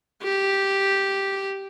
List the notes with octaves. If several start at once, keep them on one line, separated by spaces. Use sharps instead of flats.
G4